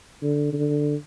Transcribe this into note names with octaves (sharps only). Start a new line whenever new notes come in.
D3
D3